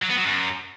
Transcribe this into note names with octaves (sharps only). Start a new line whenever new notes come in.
F#3
B3
F#3
F#2